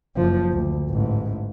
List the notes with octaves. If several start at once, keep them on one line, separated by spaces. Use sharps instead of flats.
F#1 F3
D2
A1 G#2